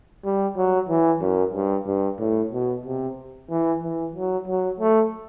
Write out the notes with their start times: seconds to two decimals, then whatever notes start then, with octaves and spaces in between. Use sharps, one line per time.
0.25 G3
0.57 F#3
0.89 E3
1.21 F#2
1.54 G2
1.86 G2
2.19 A2
2.53 B2
2.85 C3
3.50 E3
3.83 E3
4.15 F#3
4.48 F#3
4.80 A3